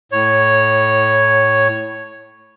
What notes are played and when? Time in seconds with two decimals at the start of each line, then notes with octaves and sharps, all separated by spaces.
0.12 A2 C#5